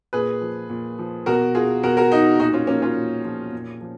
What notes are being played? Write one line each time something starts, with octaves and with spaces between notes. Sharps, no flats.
A#2 G#4 B4
F3
A#2
F3
B2 F#4 A#4
F4 G#4
B2 F#4 A#4
F#4 A#4
D#4 F#4
A#2 D#4 F#4
C#4 F4
F3 A#3 C#4
C#4 F4
A#2
F3
A#2
F3